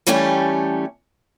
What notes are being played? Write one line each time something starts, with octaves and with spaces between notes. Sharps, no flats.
E3 G3 A3 C#4 G4 A4